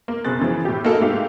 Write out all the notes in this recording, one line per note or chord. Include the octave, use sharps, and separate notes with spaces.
A#3
F#1 B2 C4 G#4 F#6 A6
C#3 E3 F3
A2 G4
A#3 D#4 F#4 G#4 A4 F5
G#2 A3 G4 F5